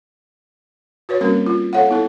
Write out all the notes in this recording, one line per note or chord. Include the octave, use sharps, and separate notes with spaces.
F#4 B4 C#5
G3 A#3 C4 C#4 F#4 A#4
F4
A4 C#5 F5 F#5
B3 E4 A4